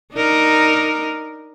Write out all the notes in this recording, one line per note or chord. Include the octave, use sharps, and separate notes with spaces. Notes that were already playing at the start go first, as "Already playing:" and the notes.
D4 D#4 A#4